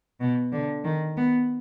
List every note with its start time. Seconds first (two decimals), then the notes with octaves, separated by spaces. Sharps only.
0.21 B2
0.52 D3
0.84 D#3
1.17 B3